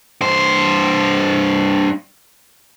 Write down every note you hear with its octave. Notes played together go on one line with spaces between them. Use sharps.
G2 C5